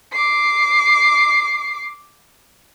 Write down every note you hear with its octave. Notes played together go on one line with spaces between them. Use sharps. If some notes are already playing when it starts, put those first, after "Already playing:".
D6 C7